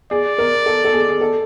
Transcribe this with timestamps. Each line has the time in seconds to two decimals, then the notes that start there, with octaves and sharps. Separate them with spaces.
0.11 G#4 D5
0.38 A#4
0.66 A4
0.84 A4
0.93 G#4
1.09 G#4
1.21 A4